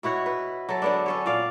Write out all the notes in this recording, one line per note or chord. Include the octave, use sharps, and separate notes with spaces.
B2 E4 F#4 C#5
B4
F#3 A4
D3 B3 D4
C#4 A4 C#5
A#2 D5 F5